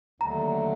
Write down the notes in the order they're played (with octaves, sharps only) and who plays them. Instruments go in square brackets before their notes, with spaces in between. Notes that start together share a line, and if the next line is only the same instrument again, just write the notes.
[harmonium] D#2 D3 F#3 A3 [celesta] A#5